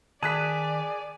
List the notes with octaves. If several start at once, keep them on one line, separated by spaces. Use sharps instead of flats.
D#3 G#4 D5 A5 F#6 B6